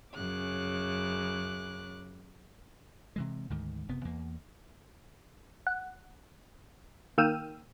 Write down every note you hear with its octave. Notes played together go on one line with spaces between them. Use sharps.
F#2 C#3 D6 F#6
C3 E3 G#3
D2 G#2 D#3
F#1 C3 B3
E2 A#3
F#5
D#3 A#3 G5 E6 F6 D#7